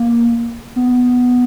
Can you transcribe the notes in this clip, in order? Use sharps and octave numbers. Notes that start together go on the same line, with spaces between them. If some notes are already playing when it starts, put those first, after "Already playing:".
Already playing: A#3
B3